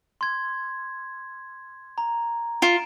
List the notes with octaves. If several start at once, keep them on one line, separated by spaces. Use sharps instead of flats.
C6 G#6
A#5
F4 D7 E7